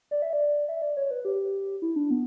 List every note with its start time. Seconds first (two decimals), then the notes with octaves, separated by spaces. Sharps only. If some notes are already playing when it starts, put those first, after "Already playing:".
0.11 D5
0.22 E5
0.33 D5
0.68 E5
0.82 D5
0.97 C#5
1.11 B4
1.25 G4
1.82 E4
1.96 D4
2.10 B3